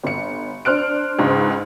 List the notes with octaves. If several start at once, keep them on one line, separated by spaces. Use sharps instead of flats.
G1 C#7
D4 C5 F6 F#6 D7
C#2 G#2